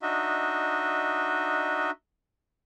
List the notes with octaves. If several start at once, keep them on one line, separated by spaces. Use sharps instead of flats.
D4 D#4 F#4 D#5 E5